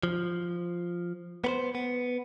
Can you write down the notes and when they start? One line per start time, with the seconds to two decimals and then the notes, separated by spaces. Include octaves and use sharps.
0.03 F3
1.44 B3 B4 C5
1.75 B3